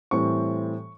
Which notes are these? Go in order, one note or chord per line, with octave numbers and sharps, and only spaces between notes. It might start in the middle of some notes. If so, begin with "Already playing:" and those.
A2 E3 G3 C4 C#6